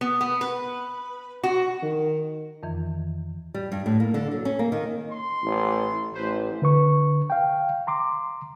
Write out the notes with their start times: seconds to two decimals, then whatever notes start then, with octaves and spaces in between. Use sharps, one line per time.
0.01 B3
0.21 B3
0.41 B4
1.43 F#4
1.83 D#3
2.63 F2 D#3 E3
3.54 G3
3.72 G2
3.86 A2
4.00 A#3
4.14 D3
4.31 F#3
4.45 C#4
4.59 A#3
4.72 D#3
5.11 C6
5.44 A1
6.14 A1 B4 C5
6.62 D3 B4 C#6
7.30 F5 G5
7.87 A#5 C6 D6